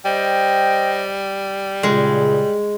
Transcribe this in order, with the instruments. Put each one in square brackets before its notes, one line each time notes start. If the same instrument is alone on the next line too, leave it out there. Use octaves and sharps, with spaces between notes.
[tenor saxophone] G3 [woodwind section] C5 D#5 G5
[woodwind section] C#2 A#2 C#3 [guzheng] G#3